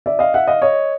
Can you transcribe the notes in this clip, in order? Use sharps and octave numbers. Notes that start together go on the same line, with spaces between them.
D5 E5
D#5 F5
E5 F#5
D#5 F5
C#5 D#5